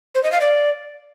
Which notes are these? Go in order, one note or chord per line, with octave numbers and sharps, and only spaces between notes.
C5
D#5
F5
D5